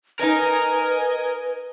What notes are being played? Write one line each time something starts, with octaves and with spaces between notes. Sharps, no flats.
C#4 D#4 A#4 B4 D#5 G#5